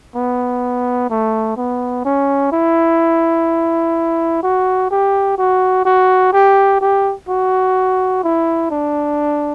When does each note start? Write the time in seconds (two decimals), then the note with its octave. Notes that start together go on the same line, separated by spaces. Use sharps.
0.15 B3
1.10 A3
1.57 B3
2.05 C#4
2.52 E4
4.43 F#4
4.91 G4
5.38 F#4
5.85 F#4
6.33 G4
6.81 G4
7.29 F#4
8.24 E4
8.71 D4